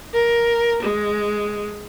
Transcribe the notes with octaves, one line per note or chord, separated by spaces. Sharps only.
A#4
G#3